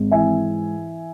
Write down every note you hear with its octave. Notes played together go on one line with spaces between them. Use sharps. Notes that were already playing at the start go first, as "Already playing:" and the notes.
Already playing: G#1 G#2
E3 E5 G#5